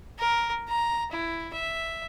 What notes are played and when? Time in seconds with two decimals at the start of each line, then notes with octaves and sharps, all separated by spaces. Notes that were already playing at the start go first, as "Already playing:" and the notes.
0.19 A#4
0.68 A#5
1.11 E4
1.53 E5